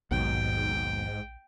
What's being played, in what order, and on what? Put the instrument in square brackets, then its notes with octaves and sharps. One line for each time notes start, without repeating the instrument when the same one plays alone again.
[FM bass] A#1 [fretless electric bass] D#2 B2 F#3 [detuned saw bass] G#2 [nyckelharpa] G5